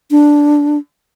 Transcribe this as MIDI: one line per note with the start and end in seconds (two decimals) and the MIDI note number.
0.11 0.78 62